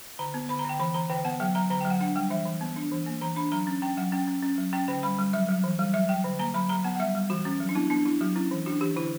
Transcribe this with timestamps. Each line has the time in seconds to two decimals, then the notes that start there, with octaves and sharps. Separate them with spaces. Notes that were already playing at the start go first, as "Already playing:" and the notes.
0.19 D3 A#5
0.34 B3
0.49 D3 B5
0.59 A#5
0.64 D3 G5
0.80 E3 B5
0.94 E3 A#5
1.10 D3 G5
1.25 B3 F#5
1.40 F#3 G5
1.55 F#3 A#5
1.70 D3 A#5
1.81 F#3 G5
1.90 F#5
2.01 D4 F#5
2.16 G3 G5
2.30 E3 E5
2.46 E3
2.61 B3
2.76 D4
2.92 E3
3.06 A#3
3.21 E3 A#5
3.36 D4 B5
3.52 F#3 A#5
3.67 C#4
3.82 C#4 G5
3.97 F#3 F#5
4.12 C#4 G5
4.27 C#4
4.42 C#4
4.58 F#3
4.73 C#4 G5
4.88 D3 G5
5.03 G3 B5
5.18 G3
5.33 F#3 E5
5.49 F#3
5.64 E3
5.79 G3
5.94 F#3 E5
6.09 F#3 G5
6.24 D3
6.39 A#3 A#5
6.54 F#3 B5
6.69 F#3 A#5
6.84 B3 F#5
6.95 F#5
7.00 G3 E5
7.15 G3
7.30 E3 F#4
7.45 C#4 F#4
7.60 F#3
7.69 D4
7.75 B3 E4
7.90 B3 D4
8.06 D4 E4
8.21 F#3 F#4
8.36 C#4 E4
8.51 E3
8.66 D4 F#4
8.81 E3 G4
8.96 D3 E4